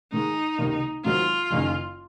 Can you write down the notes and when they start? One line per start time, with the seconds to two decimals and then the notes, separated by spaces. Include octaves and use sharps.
0.12 G#2 D#3 G#3 D#4
0.58 C#2 C3 D#3 A#3
1.05 G#2 D#3 F#3 C4 F4
1.51 F#1 F#2 D#3 A#3